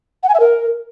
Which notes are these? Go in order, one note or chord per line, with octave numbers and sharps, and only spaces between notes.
F#5
G#5
E5
A#4